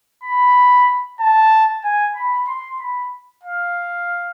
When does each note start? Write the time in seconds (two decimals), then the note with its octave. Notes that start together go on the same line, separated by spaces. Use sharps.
0.23 B5
1.20 A5
1.84 G#5
2.15 B5
2.47 C6
2.79 B5
3.43 F5